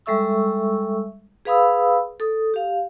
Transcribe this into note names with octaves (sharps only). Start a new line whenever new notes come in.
G3 G#3 A4 E5 C#6 E6
G#4 B4 F5 B5 D#6 E6
A4 D#6
G4 F5